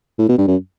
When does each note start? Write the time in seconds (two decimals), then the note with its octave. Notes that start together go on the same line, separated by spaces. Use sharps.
0.19 A2
0.29 B2
0.38 G2
0.47 F#2